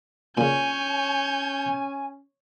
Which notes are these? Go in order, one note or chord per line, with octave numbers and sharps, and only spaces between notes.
A#2 C#3 C#4 C#5 G#5 G6